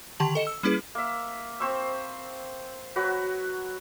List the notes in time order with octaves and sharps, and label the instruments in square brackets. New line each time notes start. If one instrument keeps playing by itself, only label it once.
[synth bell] D3 D#3 G4 A5 F#7
A4 D#5 C#7 E7
E6
G3 A#3 C#4 E4 G#4 B4
[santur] A#3 E5
C4 C5 C#6 E6
F#3 F#4 B4